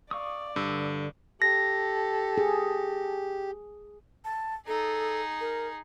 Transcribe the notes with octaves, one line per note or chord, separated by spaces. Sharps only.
D5 F5 C#6 D#6
G2 D3 E6
G4 A4 A#6
G#4
A5
D#4 G#4 A4
A#4